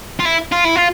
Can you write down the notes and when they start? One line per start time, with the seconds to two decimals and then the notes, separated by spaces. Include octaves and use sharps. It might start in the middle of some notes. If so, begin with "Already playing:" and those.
0.19 F4
0.25 E4
0.52 F4
0.65 E4
0.76 F4